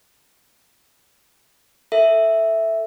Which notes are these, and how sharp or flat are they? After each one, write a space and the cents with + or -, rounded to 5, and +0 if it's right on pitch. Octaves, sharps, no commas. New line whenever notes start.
A4 +10 E5 +0